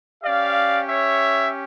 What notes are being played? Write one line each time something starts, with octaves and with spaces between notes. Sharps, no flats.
C#4 G4 D5 F5
C#5 E5